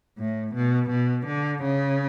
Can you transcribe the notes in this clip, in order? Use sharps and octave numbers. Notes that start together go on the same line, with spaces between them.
A2
B2
B2
D3
C#3